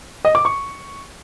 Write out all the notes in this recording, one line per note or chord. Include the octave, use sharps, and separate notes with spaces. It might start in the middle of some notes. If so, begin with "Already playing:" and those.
D#5
D6
C#6